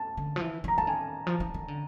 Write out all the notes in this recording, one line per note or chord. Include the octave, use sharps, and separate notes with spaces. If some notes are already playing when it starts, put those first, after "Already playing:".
Already playing: A5
D3
F3
E3
E3 A#5
E3 A5
D#3 G#5
F3
E3
D#3
D3